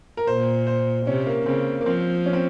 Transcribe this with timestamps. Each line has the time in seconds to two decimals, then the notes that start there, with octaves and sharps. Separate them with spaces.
0.17 A#4
0.27 A#2 C5
0.67 C5
1.06 C3 C#4
1.26 A#3
1.46 C#3 C4
1.81 A#3
1.86 F3 C4
2.26 C#4
2.33 C4